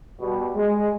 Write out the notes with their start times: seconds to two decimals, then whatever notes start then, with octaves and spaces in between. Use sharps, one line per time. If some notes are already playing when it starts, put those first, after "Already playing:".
0.20 B2 G3
0.56 G#3